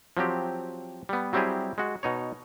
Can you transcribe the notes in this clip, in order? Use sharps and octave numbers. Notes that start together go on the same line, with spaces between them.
F3 F#3 C4 G4
G3 B3
F#3 G3 C4 E4 G4 G#4
G#3 F#4
B2 D#4 C#5